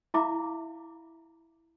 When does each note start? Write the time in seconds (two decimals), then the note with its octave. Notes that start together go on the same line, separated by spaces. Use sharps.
0.14 E4 E5 F5 A#5 B5 D6